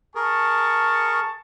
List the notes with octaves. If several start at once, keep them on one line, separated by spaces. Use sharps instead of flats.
G#4 A#4 A5 C#6